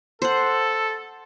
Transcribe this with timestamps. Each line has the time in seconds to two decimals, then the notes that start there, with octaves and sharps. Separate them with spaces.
0.22 A4 C5 F#5